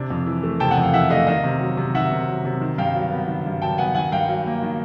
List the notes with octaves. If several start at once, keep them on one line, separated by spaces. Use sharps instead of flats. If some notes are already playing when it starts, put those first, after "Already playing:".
Already playing: C3 D4
F2
E3
A3
C3 G5 A5
F#5 G#5
F2
F5 G5
E3 E5 F#5
A3 D#5 F5
D#3 D#5 F5
C3
F#3
C3
D#3 E5 F#5
C3
F#3
C3
D#3
G2 F5 G5
F#3
B3
D#3
G2
F#3 G5 A5
B3 F#5 G#5
D#3 F#5 G#5
G2 F5 G5
F#3
A#3
D#3